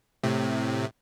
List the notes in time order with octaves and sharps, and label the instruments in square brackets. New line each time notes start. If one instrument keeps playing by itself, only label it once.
[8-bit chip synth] A2 C3